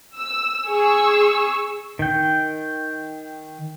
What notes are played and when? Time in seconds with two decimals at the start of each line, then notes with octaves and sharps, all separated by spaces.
0.16 E6
0.67 G#4 C#6 E6
1.99 D#3 G5